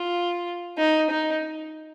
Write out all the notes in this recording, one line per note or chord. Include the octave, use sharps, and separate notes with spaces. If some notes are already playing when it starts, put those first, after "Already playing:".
Already playing: F4
D#4
D#4